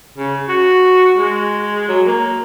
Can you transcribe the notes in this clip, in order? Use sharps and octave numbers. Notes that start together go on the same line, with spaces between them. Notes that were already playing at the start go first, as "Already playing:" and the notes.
C#3
F#4
G#3
F#3
A#3